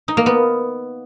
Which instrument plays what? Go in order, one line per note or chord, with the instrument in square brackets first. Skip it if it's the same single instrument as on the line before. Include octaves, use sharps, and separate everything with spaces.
[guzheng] D#4
A#3
B3